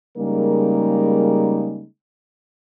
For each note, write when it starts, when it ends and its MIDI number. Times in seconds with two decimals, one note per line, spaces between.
0.18 1.85 49
0.18 1.85 55
0.18 1.85 56
0.18 1.85 58
0.18 1.85 63
0.18 1.85 70